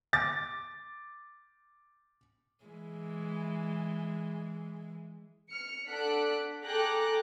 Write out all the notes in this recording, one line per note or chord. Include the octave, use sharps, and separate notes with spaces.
D6 A6
E3 G#3
F6 C#7
D4 A4 F#5 F#6 B6 D7
G#4 A4 G5 A#5 D6 F#6